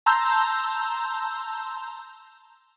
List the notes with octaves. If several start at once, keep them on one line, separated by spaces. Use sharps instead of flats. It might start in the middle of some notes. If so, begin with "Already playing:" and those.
A5 A#5 C6 E6 G6